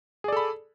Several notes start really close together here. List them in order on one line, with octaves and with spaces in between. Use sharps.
G#4 D5 A4 B5